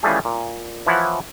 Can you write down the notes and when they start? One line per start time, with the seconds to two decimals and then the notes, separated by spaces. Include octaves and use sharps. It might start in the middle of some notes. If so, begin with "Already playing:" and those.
0.03 C#3 E3 F3 G3 A3 G#4
0.25 A#2
0.87 E3 F3 E4 C#5 F#5